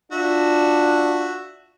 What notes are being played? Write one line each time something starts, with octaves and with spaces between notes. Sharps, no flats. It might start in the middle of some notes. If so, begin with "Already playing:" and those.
D4 F4 F#4 E5